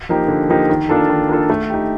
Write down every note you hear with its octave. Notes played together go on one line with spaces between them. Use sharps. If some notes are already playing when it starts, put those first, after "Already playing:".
F3 A#3 D#4 G4
D3
F3 A#3 D#4 G4
D#3
A#3 D4 F4 A4
D#3
A#3 D4 F4 A4
A3
D#4 G4